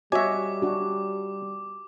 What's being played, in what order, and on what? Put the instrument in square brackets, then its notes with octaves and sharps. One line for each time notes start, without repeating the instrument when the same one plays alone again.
[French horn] G3 [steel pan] F#4 C#5 D#5 [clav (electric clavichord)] E5 G#5 [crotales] D6
[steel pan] D4 F#4